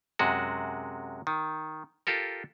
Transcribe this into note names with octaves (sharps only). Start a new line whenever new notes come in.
F#2 C3 G#3 F#4
D#3
F4 G4 A4 A#4